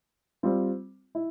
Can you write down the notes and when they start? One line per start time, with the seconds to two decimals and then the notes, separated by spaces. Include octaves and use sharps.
0.43 G3 C4 F4
1.15 E4